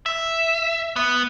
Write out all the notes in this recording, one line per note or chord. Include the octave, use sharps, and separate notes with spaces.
E5
B3